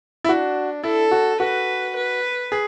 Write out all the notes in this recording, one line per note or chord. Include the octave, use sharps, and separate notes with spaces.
E4
D4 F#4
E4 A4
F#4
F#4 B4
B4
G#4